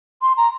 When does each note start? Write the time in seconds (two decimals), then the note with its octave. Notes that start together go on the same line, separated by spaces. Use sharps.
0.22 C6
0.37 A#5